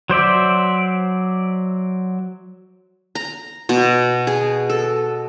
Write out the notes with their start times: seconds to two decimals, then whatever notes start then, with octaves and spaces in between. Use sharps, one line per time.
0.10 F#3 C5 D5 E5
3.15 A#5
3.69 B2
4.27 G#4
4.70 A4